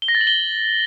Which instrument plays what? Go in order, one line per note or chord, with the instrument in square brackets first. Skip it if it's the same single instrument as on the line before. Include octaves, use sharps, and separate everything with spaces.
[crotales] G7
A#6
A6
F#7
G7